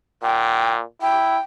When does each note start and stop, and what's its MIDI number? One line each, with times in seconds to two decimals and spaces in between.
0.23 0.82 46
0.23 0.73 79
1.02 1.37 64
1.02 1.39 79